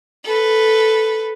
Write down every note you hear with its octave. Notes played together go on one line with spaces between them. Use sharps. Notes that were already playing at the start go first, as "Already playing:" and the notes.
A4 B4